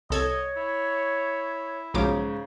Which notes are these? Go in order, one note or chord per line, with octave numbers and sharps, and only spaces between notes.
C2 A4 C#5 D#5 G#6
E4
B1 G#2 C#3 F3 D6